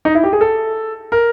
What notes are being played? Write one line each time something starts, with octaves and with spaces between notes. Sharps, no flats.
D#4
E4
G4
G#4
A4
A#4